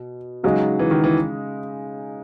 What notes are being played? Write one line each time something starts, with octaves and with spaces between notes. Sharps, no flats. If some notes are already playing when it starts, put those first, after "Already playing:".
Already playing: B2
C#3 F#3 G#3 D#4
E3
D#3
E3